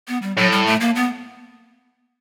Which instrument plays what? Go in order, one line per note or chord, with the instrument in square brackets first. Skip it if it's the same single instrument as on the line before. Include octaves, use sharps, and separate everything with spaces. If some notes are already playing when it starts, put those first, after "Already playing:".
[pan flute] B3
G3
[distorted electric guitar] A2 [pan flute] F#3
[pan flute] G3
A3
A#3
B3